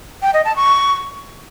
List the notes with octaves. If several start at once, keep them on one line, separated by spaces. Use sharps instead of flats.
G5
D#5
A5
C#6